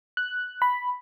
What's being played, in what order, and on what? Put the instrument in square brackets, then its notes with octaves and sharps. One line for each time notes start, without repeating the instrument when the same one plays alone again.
[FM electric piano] F#6
B5